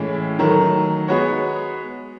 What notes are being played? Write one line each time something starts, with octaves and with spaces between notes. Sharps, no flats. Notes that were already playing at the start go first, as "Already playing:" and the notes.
Already playing: A2 E3 G#3 C#4 E4
D#3 F#3 A3
G#3 B3 F#4 C#5